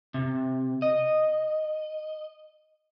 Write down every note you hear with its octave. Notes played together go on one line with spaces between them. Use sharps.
C3
D#5